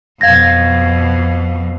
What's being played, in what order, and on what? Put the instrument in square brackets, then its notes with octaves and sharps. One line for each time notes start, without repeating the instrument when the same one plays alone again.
[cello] F2 B2 [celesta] F5 G#6 A#6